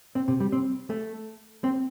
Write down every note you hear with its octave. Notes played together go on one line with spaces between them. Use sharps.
C4
C3
G3
C4
A3
C4